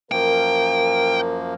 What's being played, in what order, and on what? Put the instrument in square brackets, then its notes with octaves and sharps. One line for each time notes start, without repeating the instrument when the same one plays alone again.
[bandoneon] F#2 F3 A#3 [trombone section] A#4 [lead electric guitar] G5